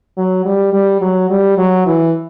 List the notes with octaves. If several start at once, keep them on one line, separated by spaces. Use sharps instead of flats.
F#3
G3
G3
F#3
G3
F#3
E3